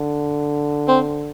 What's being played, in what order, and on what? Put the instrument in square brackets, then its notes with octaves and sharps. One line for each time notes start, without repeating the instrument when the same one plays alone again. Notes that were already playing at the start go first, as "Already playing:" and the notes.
Already playing: [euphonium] D3
[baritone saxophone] C4